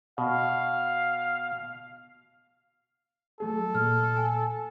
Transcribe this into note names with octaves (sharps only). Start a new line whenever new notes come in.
B2 F5
F#3 A3 G#4 A4
A#2 F6
G#5